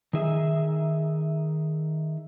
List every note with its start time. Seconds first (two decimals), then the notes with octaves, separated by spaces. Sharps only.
0.13 D#3 D#4 G#4 E5